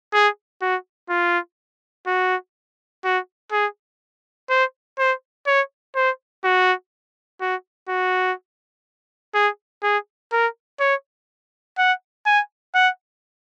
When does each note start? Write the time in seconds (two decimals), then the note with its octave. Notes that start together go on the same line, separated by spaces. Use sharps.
0.14 G#4
0.62 F#4
1.10 F4
2.06 F#4
3.04 F#4
3.52 G#4
4.50 C5
4.98 C5
5.47 C#5
5.96 C5
6.44 F#4
7.41 F#4
7.89 F#4
9.34 G#4
9.83 G#4
10.32 A#4
10.80 C#5
11.78 F#5
12.26 G#5
12.75 F#5